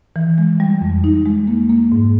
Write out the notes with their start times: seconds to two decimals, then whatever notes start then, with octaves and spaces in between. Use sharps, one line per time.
0.16 E3
0.38 G#3
0.60 G3
0.81 F2
1.04 D#4
1.26 G#3
1.47 A#3
1.70 A#3
1.92 G#2